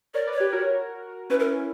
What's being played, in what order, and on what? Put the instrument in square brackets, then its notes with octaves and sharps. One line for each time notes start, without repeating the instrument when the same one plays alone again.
[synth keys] A#4 C#5 [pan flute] D5
[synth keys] B4 D5
[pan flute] C#5
[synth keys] G4 B4
F#4 A#4
[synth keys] C#4 E4 [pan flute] B4
[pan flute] A#4